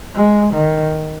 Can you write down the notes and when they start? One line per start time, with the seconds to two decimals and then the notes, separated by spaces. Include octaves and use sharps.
0.14 G#3
0.54 D#3